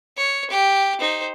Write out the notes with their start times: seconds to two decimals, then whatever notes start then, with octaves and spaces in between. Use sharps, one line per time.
0.17 C#5
0.50 G4
1.00 D#4 C5